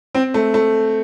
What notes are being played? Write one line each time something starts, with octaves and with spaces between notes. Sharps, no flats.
C4
A3
A3